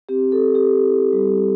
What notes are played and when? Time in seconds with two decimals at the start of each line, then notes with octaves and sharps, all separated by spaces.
0.09 C4 G4
0.32 A4
0.43 C4
0.55 G4
0.79 E4
1.12 G3